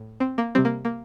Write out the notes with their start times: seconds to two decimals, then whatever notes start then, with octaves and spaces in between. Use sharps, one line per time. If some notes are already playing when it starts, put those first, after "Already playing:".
Already playing: A2
0.20 C4
0.38 A#3
0.55 C3 G3 C4
0.65 A#3
0.85 A#3